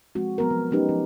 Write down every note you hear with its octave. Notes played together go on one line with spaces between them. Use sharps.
F3 G#3 C4 F#4
F#3 B3 A#4
F3
F#3 G#3 C#4 D#4 G4 B4
F3